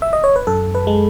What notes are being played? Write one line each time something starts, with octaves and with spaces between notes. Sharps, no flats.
E5
D#5
C#5
B4
F#2 A4
B4
G#3